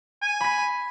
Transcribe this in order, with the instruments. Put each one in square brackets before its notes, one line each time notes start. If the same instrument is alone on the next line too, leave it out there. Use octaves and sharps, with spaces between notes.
[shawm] G#5
[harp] B5 B6